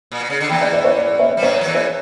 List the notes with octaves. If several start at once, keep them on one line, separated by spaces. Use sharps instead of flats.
A#2
B2
C#3
D3
E2 E3 G5 B5
D5
D5
C#5
D5
C#5 E5
G3
F#2 F#3 C#5
F#3
E2 E3
C#5